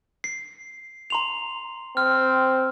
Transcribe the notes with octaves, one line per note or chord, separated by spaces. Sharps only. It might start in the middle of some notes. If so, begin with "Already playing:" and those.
C7
A#5 C6 F7
C4 F6